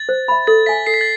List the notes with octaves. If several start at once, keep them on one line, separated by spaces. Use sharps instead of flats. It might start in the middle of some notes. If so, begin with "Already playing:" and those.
Already playing: A6
C5
E5 B5
A4 A6
E5 G#5 B6
A4 C7
B6
A6